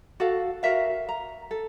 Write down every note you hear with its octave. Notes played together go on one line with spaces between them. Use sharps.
F#4 A4 F5
F#4 A#4 E5 F5
A#5
A4